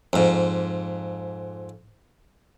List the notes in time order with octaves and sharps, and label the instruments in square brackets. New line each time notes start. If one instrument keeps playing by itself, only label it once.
[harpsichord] F2 G#2